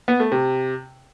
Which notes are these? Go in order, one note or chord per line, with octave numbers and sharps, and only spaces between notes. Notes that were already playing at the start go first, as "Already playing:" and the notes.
B3
A3
C3